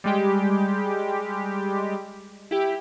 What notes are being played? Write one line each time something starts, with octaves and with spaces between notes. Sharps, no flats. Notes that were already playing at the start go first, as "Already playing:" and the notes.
G3 G#3 G4
E4 G4